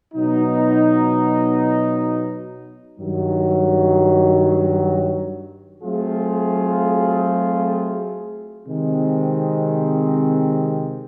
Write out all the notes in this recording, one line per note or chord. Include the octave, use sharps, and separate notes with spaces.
B2 F#3 B3 D#4
G2 D#3 F#3
F#3 A3 C4 F4 G#4
C3 D#3 G#3 C4